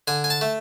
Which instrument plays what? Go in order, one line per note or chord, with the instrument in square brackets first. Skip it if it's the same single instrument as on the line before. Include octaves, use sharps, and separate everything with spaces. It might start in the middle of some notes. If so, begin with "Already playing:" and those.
[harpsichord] D3 G#5
G#5
A5
A3